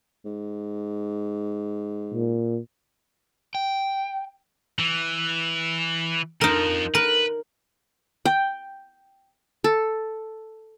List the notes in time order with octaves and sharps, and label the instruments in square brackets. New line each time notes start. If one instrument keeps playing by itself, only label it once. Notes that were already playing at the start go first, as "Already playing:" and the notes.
[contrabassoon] G#2
[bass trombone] A#2
[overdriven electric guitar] G5
[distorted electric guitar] E3
[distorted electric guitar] F2 F3 [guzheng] D#4 A#4
[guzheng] A#4 [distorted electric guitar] B4
[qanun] G5
A4